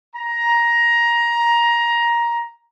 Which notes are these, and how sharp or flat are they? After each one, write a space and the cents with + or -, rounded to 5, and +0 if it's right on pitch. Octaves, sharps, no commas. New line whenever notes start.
A#5 +15